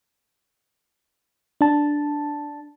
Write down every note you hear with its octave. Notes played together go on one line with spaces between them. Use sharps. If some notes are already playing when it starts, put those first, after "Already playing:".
D4 A5